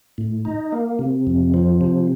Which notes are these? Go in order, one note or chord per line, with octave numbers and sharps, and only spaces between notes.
A2
D#4
A#3
C3
F2
F3
C3